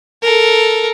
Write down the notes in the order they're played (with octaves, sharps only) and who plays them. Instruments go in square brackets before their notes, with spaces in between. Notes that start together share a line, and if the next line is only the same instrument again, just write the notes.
[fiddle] A4 A#4